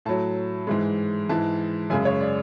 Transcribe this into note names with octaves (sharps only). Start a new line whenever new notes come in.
A2 F#3 A5
G#2 E3 G#3
G#2 E3 G#3 A5
F#2 C#3 G#3 G#5
C#5
D5